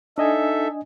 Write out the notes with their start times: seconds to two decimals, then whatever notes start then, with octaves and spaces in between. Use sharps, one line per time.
0.18 D4 D#4 A4 D#5 E5 G#5